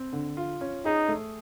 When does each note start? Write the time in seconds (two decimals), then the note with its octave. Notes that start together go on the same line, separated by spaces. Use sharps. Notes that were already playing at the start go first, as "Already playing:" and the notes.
Already playing: C4
0.13 D3
0.37 F4
0.61 C#4
0.85 D#4 G#4
1.08 A3